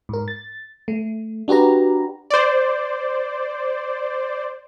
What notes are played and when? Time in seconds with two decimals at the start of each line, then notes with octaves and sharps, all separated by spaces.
0.09 G#2 A#4
0.28 A6
0.88 A3
1.48 D4 F#4 G4 B4 A#5
2.30 C5 D5